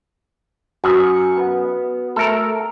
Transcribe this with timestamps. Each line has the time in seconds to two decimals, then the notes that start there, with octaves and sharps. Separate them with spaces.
0.84 F#2 F#4 C#6 D#6 F6
1.37 B3
2.16 A3 A4 A#4